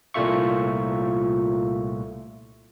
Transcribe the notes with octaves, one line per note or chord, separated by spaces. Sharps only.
C2 A#2 A3 F4 E5 C#6